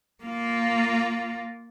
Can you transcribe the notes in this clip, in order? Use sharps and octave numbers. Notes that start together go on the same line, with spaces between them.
A#3 F4